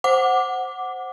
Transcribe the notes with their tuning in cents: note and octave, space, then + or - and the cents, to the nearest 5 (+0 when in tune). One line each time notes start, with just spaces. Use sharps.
C5 +0 F#5 +0 D6 +0